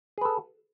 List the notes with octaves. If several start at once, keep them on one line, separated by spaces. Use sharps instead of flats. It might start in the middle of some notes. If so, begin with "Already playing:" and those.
G#4 A4 B4